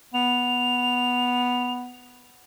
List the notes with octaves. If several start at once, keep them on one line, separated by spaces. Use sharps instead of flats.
B3 F7